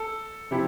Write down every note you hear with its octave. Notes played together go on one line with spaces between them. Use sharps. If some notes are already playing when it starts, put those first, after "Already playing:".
Already playing: A4
C3 F3 C4 E4 G4